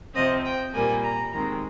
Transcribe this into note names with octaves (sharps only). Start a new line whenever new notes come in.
C3 F3 C4 D#5
G5
A#2 G3 A#3 G#5
A#5
D#3 G#3 C4 A#5